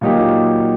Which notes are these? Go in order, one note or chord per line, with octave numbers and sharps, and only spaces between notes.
A#2 F#3 A#3 D#4 G4